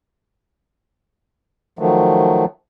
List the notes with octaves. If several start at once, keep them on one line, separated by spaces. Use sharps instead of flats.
D#3 F3 F#3 A3